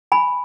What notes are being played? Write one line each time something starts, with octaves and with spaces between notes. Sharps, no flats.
G#5 B5